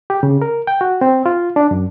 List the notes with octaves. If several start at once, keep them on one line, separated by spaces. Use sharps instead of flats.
G4
C#3
A#4
G5
F#4
C4
F4
D4
F#2